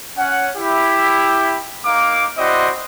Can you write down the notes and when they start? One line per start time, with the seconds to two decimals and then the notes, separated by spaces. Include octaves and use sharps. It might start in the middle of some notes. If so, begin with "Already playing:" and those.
0.17 C#4 F#5
0.57 E4 G4
1.85 A#3 D#4 F5 D6
2.38 C4 E4 F#4 C5 D5 D#5